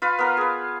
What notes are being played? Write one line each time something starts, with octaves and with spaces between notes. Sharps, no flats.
F4 B4 F5
B3 A#4 F5
G#4 B4